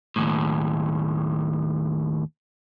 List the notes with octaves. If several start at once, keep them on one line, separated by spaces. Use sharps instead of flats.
D#2 A2